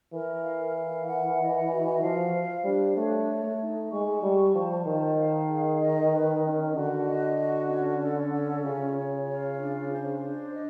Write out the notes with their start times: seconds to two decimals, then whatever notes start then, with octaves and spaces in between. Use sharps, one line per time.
0.13 E3 A#4
0.44 F5
0.75 A#4
1.07 F#5
1.39 D#5
1.70 F#4
2.02 F3 F5
2.34 C5
2.65 G3 D4
2.96 A3 C#5
3.28 A4
3.44 A3
3.60 D#4
3.92 G#3 C#6
4.23 G3 A5
4.54 F3 C5
4.86 D#3 A5
5.18 F5
5.49 G#4
5.80 D#5
6.12 B4
6.45 C#4
6.76 D3 F#4
7.08 D#5
7.39 F#4
7.70 C#4
8.02 A4
8.33 C#4
8.65 C#3 F4
8.97 C#5
9.29 F4
9.60 D4
9.92 C5
10.23 D4
10.55 D#5